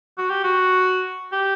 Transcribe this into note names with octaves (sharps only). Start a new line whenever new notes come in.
F#4
G4
F#4
G4